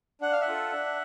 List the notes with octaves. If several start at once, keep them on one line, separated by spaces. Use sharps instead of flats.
D4 F#5
F5
E5 F#5
F4 A4
D4